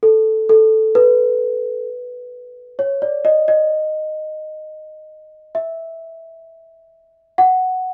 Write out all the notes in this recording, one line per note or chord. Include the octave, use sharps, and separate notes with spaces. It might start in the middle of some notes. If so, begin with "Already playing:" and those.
A4
A4
B4
C#5
D5
D#5
D#5
E5
F#5